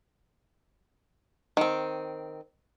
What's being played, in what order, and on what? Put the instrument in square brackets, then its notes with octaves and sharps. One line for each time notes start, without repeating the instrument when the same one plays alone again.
[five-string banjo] D#3 C4